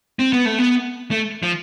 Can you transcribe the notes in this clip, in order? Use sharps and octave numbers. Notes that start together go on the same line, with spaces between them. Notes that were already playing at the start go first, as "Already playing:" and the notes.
C4
B3
A3
B3
A3
F3